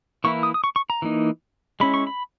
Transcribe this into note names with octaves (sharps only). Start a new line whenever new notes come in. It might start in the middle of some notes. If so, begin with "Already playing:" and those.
E3 A#3 E4 C#6
D#6
D#6
C#6
C#6
A#5
E3 A#3 D#4
G#3 C#4 E4 B5
C#6
B5